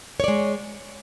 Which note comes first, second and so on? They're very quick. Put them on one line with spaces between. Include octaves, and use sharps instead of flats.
C#5 D5 G#3